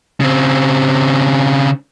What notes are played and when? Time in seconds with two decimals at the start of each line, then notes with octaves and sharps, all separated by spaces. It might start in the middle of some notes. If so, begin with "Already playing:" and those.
0.20 C#3 C4